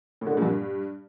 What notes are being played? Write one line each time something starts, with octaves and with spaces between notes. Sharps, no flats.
A2
D3
G#3
A#2
G2